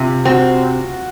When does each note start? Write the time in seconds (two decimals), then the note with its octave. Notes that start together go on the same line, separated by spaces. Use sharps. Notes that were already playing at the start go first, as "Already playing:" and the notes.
Already playing: C3 F4
0.25 C4 F#4